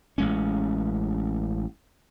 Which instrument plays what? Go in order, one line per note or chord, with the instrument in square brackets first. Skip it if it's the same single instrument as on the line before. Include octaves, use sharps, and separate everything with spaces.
[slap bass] A1 G#3 C#4